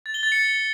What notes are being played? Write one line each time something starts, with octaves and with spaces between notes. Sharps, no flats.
A6
G7
A6
C#7